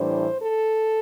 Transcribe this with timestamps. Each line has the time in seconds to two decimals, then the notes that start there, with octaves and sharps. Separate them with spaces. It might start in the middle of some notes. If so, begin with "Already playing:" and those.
Already playing: A2 E3 G3 D4 C5
0.42 A4